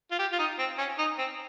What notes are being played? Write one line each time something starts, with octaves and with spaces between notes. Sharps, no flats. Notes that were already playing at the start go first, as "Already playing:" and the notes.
F4
G4
F4
D#4
C4
C#4
D#4
C4